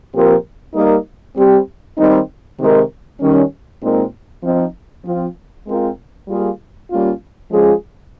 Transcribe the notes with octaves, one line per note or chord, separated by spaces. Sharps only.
A#2 F3 C4 G4 A#4
G3 A#3 D#4 A#4
G3 C4 G4
D#3 G3 C4 D#4
C3 D#3 G#3 D#4 A#4
D#3 G3 C#4
A#2 G#3 C4 D#4 A#4
F3 C4 D#4
F3 C4 F4
G#3 C4 F4 A#4
G3 A#3 F4 G#4
G3 A#3 C#4 F4
F3 G#3 C#4 F4 G#4